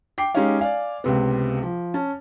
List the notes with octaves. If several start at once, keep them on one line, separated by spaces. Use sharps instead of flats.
G5 D6 C7
G#3 C#4 D#4 G4 C#5 F5
D5 F5 G#5
C#2 C3 B3
F3
C#4 A5